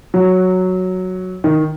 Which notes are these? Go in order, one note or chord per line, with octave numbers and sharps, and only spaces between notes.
F#3
D#3